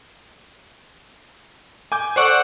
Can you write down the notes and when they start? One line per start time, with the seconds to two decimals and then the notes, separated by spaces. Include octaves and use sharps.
1.92 G#5 D6 G6
2.16 A4 C5 D5 F#5 C#6